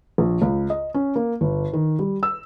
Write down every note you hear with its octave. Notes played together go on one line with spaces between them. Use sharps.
A#1
C#2
D#5
C#4
A#3
G1
D#3
G3
E6